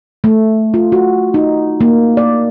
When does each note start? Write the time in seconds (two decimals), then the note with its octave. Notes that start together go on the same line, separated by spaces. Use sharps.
0.24 A3
0.74 F4
0.92 F#4
1.34 D#4
1.81 A#3
2.17 D5